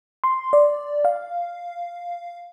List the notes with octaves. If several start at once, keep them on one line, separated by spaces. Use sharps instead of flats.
C6
D5
F5